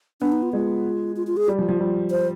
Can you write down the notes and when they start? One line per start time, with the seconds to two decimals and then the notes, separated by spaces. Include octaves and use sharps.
0.21 B3 D4
0.32 D#4
0.43 F4
0.53 G#3 F4
1.16 F4
1.27 F4
1.37 G#4
1.48 G3
1.58 F3
1.69 F3
1.80 G3
2.11 C5